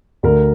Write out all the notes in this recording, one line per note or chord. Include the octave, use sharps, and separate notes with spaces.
D2 A#4